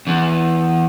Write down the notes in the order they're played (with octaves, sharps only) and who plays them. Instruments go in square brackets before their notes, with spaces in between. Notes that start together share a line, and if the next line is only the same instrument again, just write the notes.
[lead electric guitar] E2